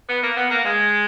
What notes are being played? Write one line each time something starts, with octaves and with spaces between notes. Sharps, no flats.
B3
A#3
B3
A#3
G#3